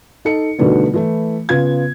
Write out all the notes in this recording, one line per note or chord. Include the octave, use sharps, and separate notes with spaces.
D#4 A4 C#7
B2 D3 D#3 G3 A3 B3
E3 A3 E4
C#3 B3 F4 G#6